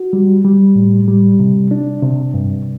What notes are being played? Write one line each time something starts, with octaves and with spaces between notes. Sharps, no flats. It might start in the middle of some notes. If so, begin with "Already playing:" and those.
Already playing: F#4
G3
G3
A2
G3
C3
D4
C3
G2